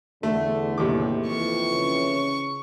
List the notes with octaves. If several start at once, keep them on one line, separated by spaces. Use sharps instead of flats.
E2 D3 A3
D#2 A2 C3 D6
F2 E3 C#6
C#3